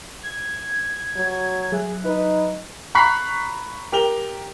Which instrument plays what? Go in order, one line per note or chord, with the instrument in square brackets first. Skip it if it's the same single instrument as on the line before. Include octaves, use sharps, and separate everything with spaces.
[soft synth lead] G#6
[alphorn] F#3
[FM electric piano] F#3 E5 F#6 [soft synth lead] G#4
[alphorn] D#4 [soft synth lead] B4
[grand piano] A#5 B5 C#6 F#6 B6 C7
G4 A#4 F7 G7